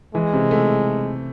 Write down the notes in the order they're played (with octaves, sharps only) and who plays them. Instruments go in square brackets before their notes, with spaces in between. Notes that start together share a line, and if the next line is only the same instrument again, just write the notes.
[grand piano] E3 [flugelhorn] G#3
[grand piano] C3
A3